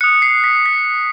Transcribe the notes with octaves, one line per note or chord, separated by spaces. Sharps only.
D#6 F#6 C#7
C7
B6
B6